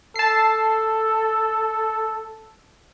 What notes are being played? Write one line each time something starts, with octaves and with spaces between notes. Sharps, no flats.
A4 A5 C7